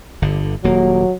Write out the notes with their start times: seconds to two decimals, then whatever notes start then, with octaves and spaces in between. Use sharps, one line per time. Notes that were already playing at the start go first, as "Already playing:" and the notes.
0.22 G1 D3
0.64 D#1 F#3 A#3